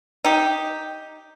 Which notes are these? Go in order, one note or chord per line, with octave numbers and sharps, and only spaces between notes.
D#4 G4